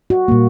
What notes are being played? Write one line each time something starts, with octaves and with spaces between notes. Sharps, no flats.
F#4
A#2 G3 A#3